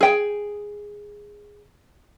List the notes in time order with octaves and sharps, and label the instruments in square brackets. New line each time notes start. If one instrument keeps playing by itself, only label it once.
[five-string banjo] G#4 G5